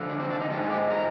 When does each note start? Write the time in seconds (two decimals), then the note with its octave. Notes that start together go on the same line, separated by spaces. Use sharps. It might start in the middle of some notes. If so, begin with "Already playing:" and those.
Already playing: D3 F3
0.10 D4
0.20 C4
0.30 D4
0.40 D#4
0.50 G#2 F3 G#3 G4
0.63 G#4
0.70 G4
0.91 A#4